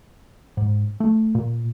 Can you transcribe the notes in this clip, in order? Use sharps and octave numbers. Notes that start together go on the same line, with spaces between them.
G#2
A3
A#2